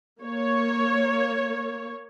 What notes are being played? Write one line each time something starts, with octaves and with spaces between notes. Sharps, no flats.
A#3 C#5